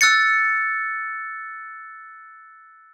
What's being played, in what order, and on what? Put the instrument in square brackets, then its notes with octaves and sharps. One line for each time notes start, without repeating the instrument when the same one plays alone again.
[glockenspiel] E6 F#6 A6 C#7